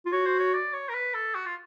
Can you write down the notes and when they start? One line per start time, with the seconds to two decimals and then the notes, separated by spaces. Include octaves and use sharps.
0.06 F4
0.12 F#4 C#5
0.26 C5
0.39 C#5
0.53 D5
0.73 C#5
0.89 A#4
0.94 B4
1.14 A4
1.35 F#4
1.45 F4